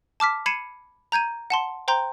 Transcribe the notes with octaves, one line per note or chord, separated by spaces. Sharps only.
A5 D6 F6 B6
B5 G#6 C7 C#7 D#7 E7
A#5 G6 G#6 D#7
F#5 A5 C6
C5 G5 A#5 C6 G6